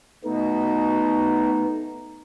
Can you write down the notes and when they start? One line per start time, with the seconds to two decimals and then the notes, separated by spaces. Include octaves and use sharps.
0.24 B2 A3 B3 D#4